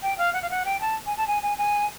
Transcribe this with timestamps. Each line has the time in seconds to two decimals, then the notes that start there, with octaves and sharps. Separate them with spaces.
0.03 G5
0.18 F5
0.34 F#5
0.42 F5
0.50 F#5
0.65 G5
0.81 A5
1.06 G#5
1.17 A5
1.27 G#5
1.43 G#5
1.58 G#5